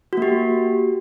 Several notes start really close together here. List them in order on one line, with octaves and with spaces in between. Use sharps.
F#4 A#3 G4